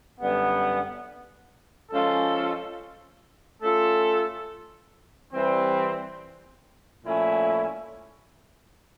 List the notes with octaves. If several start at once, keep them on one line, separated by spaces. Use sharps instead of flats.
F#2 D3 G3 B3
F3 G#3 C#4 F4 A4
A3 C#4 F4 A4
E3 G3 C4
A#2 F3 A3 C#4 E4